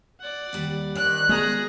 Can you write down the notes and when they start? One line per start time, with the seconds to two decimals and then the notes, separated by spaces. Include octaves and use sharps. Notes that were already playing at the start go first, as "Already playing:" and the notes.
0.20 D5 F#5
0.53 D#2 G3
0.95 D#3 D5 F#6
1.29 G#3 B3 G#4 E5 A#5